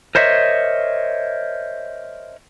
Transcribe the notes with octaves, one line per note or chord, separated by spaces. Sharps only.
A#4 C5 C#5 D#5 E5